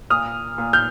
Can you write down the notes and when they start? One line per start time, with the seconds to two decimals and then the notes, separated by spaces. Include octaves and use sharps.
0.10 A#2 D#6 F6
0.58 A#2
0.73 F6 G6